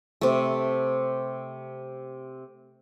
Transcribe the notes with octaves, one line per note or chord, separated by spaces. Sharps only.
C3 A3